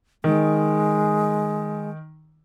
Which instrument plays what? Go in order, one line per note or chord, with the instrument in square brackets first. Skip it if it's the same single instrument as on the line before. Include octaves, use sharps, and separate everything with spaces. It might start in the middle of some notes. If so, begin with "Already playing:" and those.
[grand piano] D#3 [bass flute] G#3